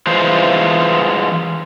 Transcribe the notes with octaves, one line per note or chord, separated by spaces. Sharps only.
E3 G#3 F4 C5